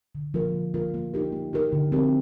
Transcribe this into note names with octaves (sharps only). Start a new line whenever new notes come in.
D3
F3 A#3 F4 A#4
D3
F3 A#3 F4 A#4
A#3
D#4 G4 A#4
A#3
D#4 G4 A#4
D3
F3 C4 G4 A#4